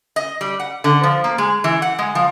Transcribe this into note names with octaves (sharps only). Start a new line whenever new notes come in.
D#5
G3
F#5
D3
F3
A#3
G#3
E3
F#5
G#3
F3